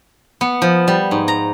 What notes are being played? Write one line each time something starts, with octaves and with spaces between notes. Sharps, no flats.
B3
F3
G3
G#2
A#5